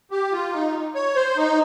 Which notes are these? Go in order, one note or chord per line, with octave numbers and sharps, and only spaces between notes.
G4
F4
D#4
C#5
C5
D#4